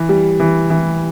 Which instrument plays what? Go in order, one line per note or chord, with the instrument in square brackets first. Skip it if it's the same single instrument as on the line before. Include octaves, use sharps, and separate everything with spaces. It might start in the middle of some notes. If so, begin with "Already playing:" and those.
Already playing: [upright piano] E3
G3
E3
E3